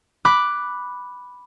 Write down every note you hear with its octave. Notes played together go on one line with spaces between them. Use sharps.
B5 D6 F#6